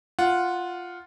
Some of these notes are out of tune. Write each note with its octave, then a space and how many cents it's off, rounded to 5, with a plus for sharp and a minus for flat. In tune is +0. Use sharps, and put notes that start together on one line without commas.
F4 +0 F#5 -10